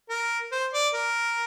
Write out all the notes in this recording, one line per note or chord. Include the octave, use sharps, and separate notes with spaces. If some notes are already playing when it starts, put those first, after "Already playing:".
A#4
C5
D5
A#4